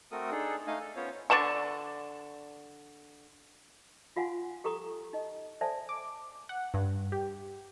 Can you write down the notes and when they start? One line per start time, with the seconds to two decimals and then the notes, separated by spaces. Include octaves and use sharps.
0.11 A3 C4 F#4 A4 A#4 D#6
0.31 D4 D#4 G#4 A4
0.67 A3 D#4 D#5 F5 G#5
0.80 A4
0.96 B3 C#4 F4 C5 C#5
1.30 D3 D5 A5 C#6
4.16 D#4 F4 F5 F#5 G#5 C6
4.64 G4 A4 A#5 C#6 D#6
5.13 D#4 D#5
5.61 A4 C5 D5 E5 G#5 A5
5.89 D6
6.49 F#5
6.74 G2
7.12 G4